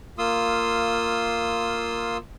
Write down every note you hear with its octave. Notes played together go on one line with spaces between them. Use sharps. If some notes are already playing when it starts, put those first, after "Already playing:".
A#3 F4 C6 D#6 E6